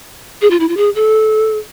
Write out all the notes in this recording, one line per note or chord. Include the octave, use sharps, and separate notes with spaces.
G#4
F4
E4
F4
G#4
A4